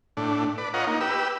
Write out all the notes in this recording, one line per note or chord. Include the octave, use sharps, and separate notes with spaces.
A2 D4
B4 D5
F4 C#5 D#5 F#5 A#5
A#3 D#4
G4 B4 E6